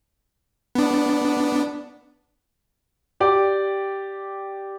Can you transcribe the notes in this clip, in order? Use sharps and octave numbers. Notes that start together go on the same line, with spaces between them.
B3 D4
G4 D5 G5